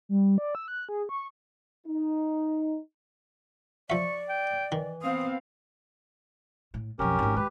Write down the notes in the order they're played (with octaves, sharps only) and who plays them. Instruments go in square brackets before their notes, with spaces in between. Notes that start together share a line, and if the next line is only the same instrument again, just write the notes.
[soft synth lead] G3
D5
E6
F#6
G#4
C#6
[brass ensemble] D#4
[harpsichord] F3 E5 [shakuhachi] D5 [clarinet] C#6
[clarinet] G5
[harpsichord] D#3 [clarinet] E3
[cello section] B3 C4 F5 [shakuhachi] D#6
[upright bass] A2
[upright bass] B1 F2 [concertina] C#4 G4 A#4
[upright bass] G#1 G#2
[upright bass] G#3 [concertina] G4 B4